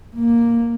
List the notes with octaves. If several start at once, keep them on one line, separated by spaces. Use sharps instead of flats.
A#3